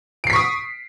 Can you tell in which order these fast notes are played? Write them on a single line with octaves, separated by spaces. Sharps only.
D7 C7 B6 C#6 D#6